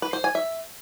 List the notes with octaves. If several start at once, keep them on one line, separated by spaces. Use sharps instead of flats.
B4
C5
G#5
E5